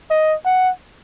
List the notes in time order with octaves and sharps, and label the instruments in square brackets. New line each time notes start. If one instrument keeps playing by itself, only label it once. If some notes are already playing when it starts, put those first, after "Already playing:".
[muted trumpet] D#5
F#5